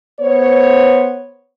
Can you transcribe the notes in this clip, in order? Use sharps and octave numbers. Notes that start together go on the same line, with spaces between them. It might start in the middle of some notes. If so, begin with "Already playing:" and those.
B3 C5 C#5